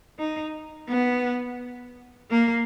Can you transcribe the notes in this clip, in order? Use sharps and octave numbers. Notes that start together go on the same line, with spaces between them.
D#4
B3
A#3